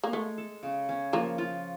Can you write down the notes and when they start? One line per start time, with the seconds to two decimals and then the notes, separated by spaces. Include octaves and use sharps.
0.04 A#3
0.13 G#3 A3
0.38 A4
0.63 C#3
0.89 C#4
1.13 F3 A#3
1.38 F4